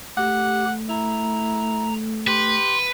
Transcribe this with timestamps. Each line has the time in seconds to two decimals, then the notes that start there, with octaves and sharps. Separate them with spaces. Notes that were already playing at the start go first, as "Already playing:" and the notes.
0.17 A3 G4 F#5
0.89 E4 A#5
2.27 G4 B4 C6